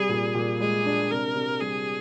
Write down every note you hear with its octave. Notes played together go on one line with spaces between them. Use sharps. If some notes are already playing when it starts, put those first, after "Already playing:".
Already playing: C3 G3 G#4
A#2
A#2
G#3 G#4
D4
C3 A#4
C3
G3 G#4